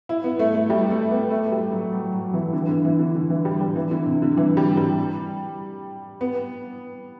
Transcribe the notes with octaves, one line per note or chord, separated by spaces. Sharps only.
E4
B3
A3
A3
G3
A3
B3
A3
G3
F#3
F#3
F#3
E3
D3
E3
D3
E3
D3
D3
E3
G3
G3
E3
D3
C3
D3
E3
G3
G3
B3